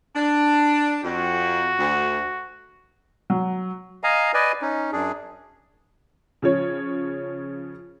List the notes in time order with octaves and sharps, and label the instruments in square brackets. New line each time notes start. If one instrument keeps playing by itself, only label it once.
[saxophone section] D4
[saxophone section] F2 [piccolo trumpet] F#4
[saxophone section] D2
[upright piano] F#3
[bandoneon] D#5 F5 G#5 A#5
B4 D5 D#5 G#5
C#4 D#4
F#2 D4 G#4
[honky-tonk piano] C#3 F3 C#5